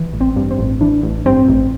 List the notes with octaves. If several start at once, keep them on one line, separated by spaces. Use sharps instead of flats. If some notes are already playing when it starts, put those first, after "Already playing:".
Already playing: E3
A1
C4
G2
C4
A1
E3 D4
A1
G2 C4
A1